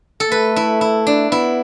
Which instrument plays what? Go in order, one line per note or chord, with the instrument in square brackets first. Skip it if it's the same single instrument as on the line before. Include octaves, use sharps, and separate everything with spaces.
[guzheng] A4
[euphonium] A3 [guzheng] B4
[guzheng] E4
E4
D4
[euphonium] B3 [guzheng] E4